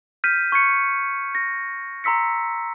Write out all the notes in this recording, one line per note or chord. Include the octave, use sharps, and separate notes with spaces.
F6 G6 B6 D#7
C#6 G#6 C#7
A#6
A#5 C6 E6 B6 C#7